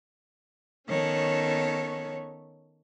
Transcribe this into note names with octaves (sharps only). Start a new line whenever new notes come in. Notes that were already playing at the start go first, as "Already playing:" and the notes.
D#3 B3 C#4 A4 C#5